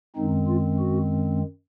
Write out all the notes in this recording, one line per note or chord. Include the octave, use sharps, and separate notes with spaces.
F#2 D#3 G#3 C4 D#4
F4
F#4